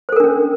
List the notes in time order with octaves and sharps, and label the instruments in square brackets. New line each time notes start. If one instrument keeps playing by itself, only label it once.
[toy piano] C5
A4
A#4
D4
C#4